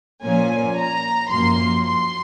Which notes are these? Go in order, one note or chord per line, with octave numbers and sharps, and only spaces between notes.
A#2 F3 A#3 C#4 G#5
A#5
F#2 F3 A#3 C6
C6